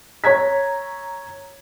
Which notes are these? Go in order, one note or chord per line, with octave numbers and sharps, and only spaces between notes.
C#5 A#5 G#6 B6